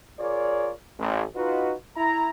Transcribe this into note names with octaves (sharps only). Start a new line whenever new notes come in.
F4 G#4 A#4 C#5 D5
A1
D#4 F4 F#4 B4
E4 A#5